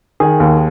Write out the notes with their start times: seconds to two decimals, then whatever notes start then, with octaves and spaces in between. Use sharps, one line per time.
0.20 D#3 G#4
0.40 D#2